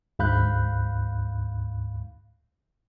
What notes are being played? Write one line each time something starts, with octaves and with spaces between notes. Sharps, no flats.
D2 G#2 F5 B5 F#6 G6